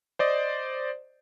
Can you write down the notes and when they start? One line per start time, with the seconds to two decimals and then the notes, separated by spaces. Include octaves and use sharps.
0.19 C5 D5 D#5